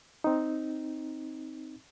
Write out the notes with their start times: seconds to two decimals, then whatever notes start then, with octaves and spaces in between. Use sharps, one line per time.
0.24 C4 D#4